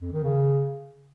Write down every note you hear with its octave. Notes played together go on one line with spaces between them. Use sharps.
F2
D#3
C#3